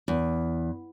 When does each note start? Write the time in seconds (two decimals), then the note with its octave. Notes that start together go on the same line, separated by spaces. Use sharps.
0.08 E2